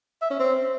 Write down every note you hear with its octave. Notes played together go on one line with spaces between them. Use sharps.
E5
C#4
C4